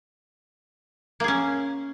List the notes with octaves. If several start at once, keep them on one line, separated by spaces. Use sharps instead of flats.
A#3 C#4 G#4